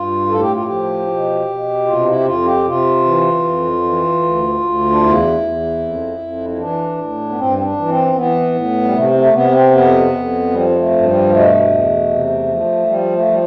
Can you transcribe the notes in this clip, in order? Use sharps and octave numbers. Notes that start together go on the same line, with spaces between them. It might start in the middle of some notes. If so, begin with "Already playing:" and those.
Already playing: G2 F4
A2 A4
G4
F4
F3 G4
B2
B2
C3 F4
D4
E4
G4
F2 F4
G4
C3 F4
E3
F2
E3
D2
D2
D4
E2 E4
E2
F2
F2
E4
E3 D4
A2
B3
G2 C4
C4
D4
E3
C4
E3 B3
A2
G3
C3 A3
A3
C3 B3
C4
F2 B3
F2
F3 G3
G3
A3
G2
G3
B2 A3
E2
C3
F3
F3 G3
A3
F3 G3